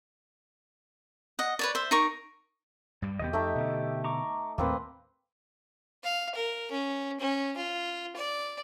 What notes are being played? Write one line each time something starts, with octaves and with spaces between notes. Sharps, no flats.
D#5 F#5
B4 C#5 D5
C5 E5
D#4 A#4 C#6
G2 G3
D#2 C3 B3 G4 D#5
F2 A3 D#4 E5
B2 D3
A#5 C#6 D6
D#2 A2 A#3 C4 B4
F5
A#4
C#4
C#4
F4
D5